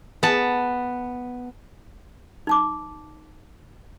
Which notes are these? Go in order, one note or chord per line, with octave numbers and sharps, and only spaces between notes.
B3 A5
D#4 A5 D6